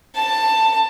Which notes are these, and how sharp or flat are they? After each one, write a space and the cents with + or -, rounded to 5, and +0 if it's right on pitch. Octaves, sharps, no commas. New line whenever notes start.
A5 +15